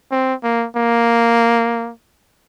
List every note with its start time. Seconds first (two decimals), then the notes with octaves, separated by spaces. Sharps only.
0.11 C4
0.43 A#3
0.76 A#3